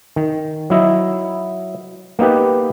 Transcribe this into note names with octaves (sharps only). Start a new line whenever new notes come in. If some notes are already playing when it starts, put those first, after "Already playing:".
D#3
F#3 E4 D#5
A#3 B3 D#4 G4 B4